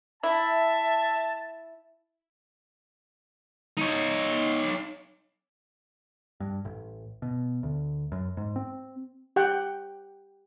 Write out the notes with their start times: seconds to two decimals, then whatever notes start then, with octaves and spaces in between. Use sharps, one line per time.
0.23 E4 E5 A5
3.77 D#4 C#5
6.40 G2
6.65 A1
7.22 B2
7.63 D2
8.12 F#2
8.37 G#2
8.56 C4
9.36 G4 F#5 G5